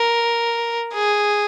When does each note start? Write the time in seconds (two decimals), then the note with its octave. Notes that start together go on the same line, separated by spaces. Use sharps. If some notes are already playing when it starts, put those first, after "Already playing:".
Already playing: A#4
0.94 G#4